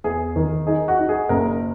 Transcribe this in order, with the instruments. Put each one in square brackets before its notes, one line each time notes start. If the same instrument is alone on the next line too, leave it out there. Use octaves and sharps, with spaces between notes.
[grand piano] E2 G#4
D#3
D#4 G#4
F#4
D#4
G#4
F#1 A#4